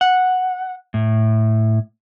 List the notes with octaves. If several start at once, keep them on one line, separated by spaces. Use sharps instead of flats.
F#5
A2